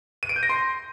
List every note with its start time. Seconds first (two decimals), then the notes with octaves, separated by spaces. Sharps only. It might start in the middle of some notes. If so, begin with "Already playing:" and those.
0.23 D#7
0.29 D7
0.36 G6
0.43 A#6
0.49 C6